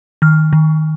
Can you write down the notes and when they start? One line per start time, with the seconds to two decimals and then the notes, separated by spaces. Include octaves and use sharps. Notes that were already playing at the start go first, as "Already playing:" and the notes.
0.22 D#3 F6
0.53 D#3